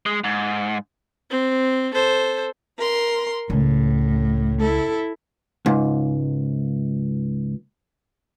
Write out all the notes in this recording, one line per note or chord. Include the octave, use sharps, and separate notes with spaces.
G#3
G#2
C4
A4 C5
A#4 C6
C#2 A2
E4 A4
C#2 G#2